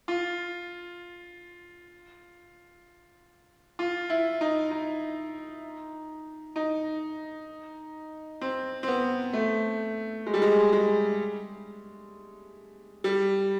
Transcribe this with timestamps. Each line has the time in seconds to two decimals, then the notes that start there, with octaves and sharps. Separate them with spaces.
0.08 F4
3.79 F4
4.10 E4
4.41 D#4
4.71 D#4
6.56 D#4
8.41 C4
8.83 C4
8.88 B3
9.33 A3
10.26 G#3
10.34 G3
10.42 G#3
10.73 G#3
13.04 G3